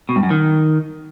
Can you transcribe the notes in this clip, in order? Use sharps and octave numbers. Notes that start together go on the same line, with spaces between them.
B2
G2
F#2
D#3